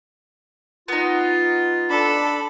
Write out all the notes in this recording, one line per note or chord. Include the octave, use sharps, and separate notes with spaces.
B3 D#4 F4
D4 A4 B5